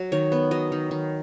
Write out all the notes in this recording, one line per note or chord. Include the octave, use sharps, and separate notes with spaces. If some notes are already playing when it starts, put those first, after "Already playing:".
Already playing: F#3
D#3 C#5
B3
F#3 D#5
D#3
D#3